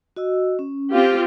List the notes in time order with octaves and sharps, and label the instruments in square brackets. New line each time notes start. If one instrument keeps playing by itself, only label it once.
[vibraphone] F#4 D#5 E6
C#4
[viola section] C4 F4 G4 [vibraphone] F5